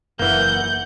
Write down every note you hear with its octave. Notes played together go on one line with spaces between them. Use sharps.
F#1 E3 A#3 F#5 G6